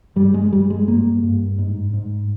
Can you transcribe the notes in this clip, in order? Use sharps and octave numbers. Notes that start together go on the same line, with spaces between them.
G2 G3
G#3
G2 G3
G#3
G2 A#3
G2
G#2
G#2